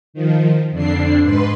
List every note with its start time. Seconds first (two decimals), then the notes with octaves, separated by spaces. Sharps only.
0.14 D#3 F3
0.71 F2 D3 D4 C7
1.23 G#2 B4 C6